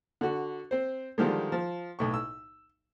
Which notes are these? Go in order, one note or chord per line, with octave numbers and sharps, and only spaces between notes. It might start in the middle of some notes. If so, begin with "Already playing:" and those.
D3 F#4
C4 C5
D3 D#3 F3 G3 G#3
F3
B1 A2 C#6
E6